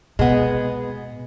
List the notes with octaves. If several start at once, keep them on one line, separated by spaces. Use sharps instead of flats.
B2 G#3 B3